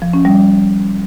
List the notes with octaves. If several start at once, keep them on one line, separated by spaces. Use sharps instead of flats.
F3
C#4
G3